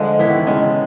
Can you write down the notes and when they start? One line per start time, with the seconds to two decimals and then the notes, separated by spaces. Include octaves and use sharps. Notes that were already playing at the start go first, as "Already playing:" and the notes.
Already playing: D3 F3 G#3
0.19 E3 B3 E4
0.28 D#3
0.37 E3
0.47 C#3 G#3